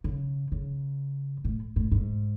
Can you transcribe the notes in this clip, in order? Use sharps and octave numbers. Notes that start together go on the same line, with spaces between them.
C#3
C#3
A2
A2
G#2